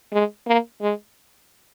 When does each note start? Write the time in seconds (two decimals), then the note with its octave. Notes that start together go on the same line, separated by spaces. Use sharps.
0.13 G#3
0.47 A#3
0.81 G#3